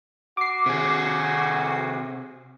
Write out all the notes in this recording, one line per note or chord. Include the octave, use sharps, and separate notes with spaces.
F#4 D6 C7
C3 G#4